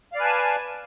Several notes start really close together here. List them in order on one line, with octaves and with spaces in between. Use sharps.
F5 D5 B4 G#5 A5